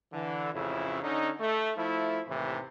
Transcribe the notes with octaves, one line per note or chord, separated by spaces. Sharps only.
D3 E3
A1 F2 C#3 E4
D3 C#4 D#4
A3
F3 A3 E4
D#2 A2 C3 E3